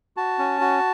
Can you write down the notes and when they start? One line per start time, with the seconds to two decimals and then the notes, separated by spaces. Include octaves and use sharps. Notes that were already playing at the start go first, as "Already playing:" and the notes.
0.17 F#4 A5
0.39 C#4
0.61 F#4